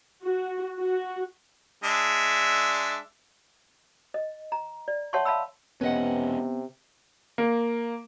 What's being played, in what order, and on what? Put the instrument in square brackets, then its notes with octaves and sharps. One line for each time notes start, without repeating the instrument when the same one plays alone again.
[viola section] F#4
F#4
[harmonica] G#3 D4 E5
[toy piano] D#5
A#5
D5
C#5 E5 F#5 A5 C6 C#6
E5 F5 A5 B5 E6
[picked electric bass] E1 C#4 [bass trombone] C3 [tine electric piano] B3 [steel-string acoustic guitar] B4 D#5 F#5
[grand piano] A#3